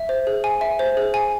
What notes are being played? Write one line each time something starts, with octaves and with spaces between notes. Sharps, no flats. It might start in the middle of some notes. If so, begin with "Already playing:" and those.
Already playing: E5
C5
G#4
G#5
E5
C5
G#4
G#5